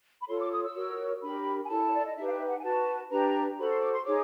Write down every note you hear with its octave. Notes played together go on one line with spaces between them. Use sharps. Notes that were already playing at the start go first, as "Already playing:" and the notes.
B5
F4 A4 C#5 C6
D6
D#6
E6
F#4 A#4 C#5
D4 G4 A#4 B5
G#5
E4 A4 C#5 A5
C#5
D5
D#5
D#4 G4 B4 E5
F5
E5
F#5
G#5
F#4 B4 A5
D4 G4 B4 A#5
F#4 A4 C5 B5
C6
D6
C6
D#4 G#4 C#5 D6